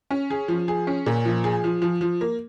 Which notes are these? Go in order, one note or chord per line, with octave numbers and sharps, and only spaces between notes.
C#4
G#4
F3
G#4
C#4
A#2
F3
G#4
F3
F3
F3
A#3